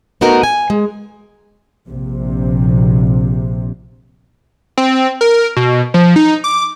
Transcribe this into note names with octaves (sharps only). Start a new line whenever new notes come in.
A3 B3 D#4 F#4 A#4
G#5
G#3
A#1 C3
C4
A#4
B2
F3
D#4
D6